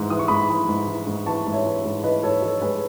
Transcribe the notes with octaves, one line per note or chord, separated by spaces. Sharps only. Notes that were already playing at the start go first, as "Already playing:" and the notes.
Already playing: G#2 E3
E3 D#6
C#6
G#2 B5 D#6
E3
G#2
E3
G#2
E3 A5 C#6
G#2
C#5 E5
E3
G#2
E3 B4 D#5
G#2 A4 C#5
E3 A4 C#5
G#2 G#4 B4